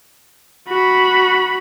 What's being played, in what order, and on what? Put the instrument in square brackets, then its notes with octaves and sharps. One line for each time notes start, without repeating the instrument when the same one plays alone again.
[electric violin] F#4 B5